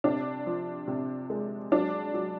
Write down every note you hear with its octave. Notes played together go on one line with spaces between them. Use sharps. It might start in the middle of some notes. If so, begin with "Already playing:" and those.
C3 D4
F3
C3
G#3
F#3 D4
F#3